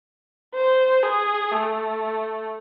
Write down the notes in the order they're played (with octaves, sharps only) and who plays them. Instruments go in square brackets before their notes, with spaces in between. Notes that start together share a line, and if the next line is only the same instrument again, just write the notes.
[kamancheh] C5
G#4
A3